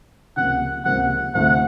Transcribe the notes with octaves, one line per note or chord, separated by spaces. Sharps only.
C#2 C3 F3 A#3 F#5
C#2 C3 F3 A#3 F#5
D2 C3 F3 A3 C4 F#5